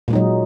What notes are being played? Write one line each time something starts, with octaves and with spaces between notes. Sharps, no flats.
A#2 F#3 G#3 D#4